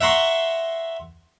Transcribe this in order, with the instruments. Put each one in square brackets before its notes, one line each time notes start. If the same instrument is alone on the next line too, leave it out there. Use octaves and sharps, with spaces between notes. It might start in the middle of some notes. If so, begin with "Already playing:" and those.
[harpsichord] E5 F#5 A#5 C6 C#6